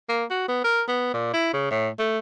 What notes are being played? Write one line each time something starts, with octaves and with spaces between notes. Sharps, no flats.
A#3
F#4
B3
A#4
B3
A#2
E4
C#3
A2
A3